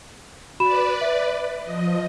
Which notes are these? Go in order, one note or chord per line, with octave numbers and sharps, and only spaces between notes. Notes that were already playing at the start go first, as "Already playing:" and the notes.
F#4 B4 D5 B5 E7
E5
F3 D#5